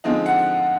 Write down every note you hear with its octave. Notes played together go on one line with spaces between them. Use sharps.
D3 F3 G#3 C4 D#4
F#5